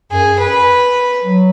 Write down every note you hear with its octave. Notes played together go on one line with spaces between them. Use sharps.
F#2 G#4
F#2 B4
F#3